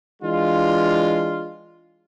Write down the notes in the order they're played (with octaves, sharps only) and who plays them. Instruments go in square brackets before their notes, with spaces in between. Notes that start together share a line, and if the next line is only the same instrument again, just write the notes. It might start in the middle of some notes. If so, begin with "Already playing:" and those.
[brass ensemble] E3 G#3 D4 F4